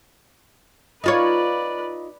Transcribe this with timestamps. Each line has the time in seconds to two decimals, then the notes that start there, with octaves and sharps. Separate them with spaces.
1.04 D#4 F4 B4 C#5 D5